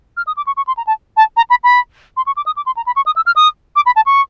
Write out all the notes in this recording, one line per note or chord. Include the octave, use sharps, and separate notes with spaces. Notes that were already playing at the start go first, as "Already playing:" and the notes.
F6
D#6
D6
C#6
C#6
C6
A#5
A5
A5
A#5
B5
B5
C6
C#6
D6
D#6
D6
C6
A#5
B5
C#6
D#6
E6
F6
D#6
D6
B5
A5
C#6